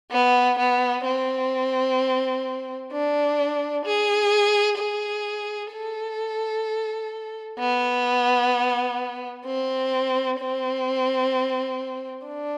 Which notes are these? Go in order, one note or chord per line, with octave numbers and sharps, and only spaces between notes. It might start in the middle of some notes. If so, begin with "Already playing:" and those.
B3
B3
C4
D4
G#4
G#4
A4
B3
C4
C4
D4